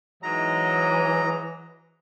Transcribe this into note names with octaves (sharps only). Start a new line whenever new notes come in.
G#2 E3 F#3 D#5 A#5